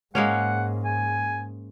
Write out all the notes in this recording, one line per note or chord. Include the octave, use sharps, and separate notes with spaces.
G#2 G#3 A#3 C#4 F#5
G#5